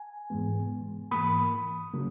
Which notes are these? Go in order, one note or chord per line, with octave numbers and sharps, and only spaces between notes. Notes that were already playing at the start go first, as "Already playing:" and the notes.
Already playing: G#5
G#2 E3 G#3 B3
G#2 E3 A#3 B5 D#6
C#3 F#3 A#3